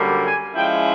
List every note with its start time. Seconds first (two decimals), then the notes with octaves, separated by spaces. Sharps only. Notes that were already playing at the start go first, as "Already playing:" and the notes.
Already playing: F#2 D3 G3 A#3
0.22 G#5
0.55 F3 G#3 C#4 E4 G5